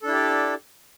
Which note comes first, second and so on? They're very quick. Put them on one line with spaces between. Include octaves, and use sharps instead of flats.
A4 D4 E4 G4 D5